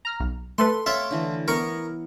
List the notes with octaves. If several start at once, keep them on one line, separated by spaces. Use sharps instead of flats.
A#5 F6
B1
A3 A4 B4 C6
F4 C#5 E5 G5
D3 E3
B3 E4 A#4 C#6